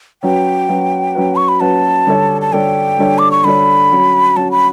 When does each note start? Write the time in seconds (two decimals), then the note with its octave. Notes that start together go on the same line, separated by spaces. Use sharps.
0.23 F#3 C#4 F#4 B4 G5
0.69 F#3 C#4 F#4 B4
1.15 F#3 C#4 F#4 B4
1.36 C#6
1.48 B5
1.60 F#3 C#4 F#4 B4 A5
2.07 D3 G3 D4 A4 C#5
2.41 A5
2.53 D3 G3 D4 A4 C#5 G5
2.98 D3 G3 D4 A4 C#5
3.18 D6
3.31 C#6
3.44 D3 G3 D4 A4 C#5 B5
3.91 F#3 C#4 F#4
4.36 F#3 C#4 F#4 A5
4.51 B5